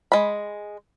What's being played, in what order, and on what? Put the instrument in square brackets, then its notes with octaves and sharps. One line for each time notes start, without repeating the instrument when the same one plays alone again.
[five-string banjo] G#3 B5